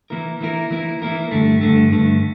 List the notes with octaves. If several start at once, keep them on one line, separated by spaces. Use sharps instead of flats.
E3 A#3 E4 A#4
E3 A#3 E4 A#4
E3 A#3 E4 A#4
E3 A#3 E4 A#4
G2 D3 A3
G2 D3 A3
G2 D3 A3